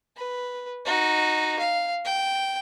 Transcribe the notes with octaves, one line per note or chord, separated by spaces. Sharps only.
B4
D#4 F#4
F5
G5